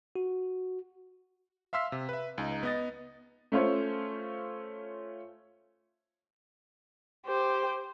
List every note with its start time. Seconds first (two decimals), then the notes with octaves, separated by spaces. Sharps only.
0.16 F#4
1.73 E5 F5 C6 E6 B6
1.92 C3
2.09 B4 E5
2.38 C#2 D#4 A#5
2.63 B3 D#5 A6
3.52 A3 C#4 F4 C5 C#5
7.26 G4 C5